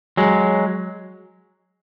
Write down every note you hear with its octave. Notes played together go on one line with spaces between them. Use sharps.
F#3 G#3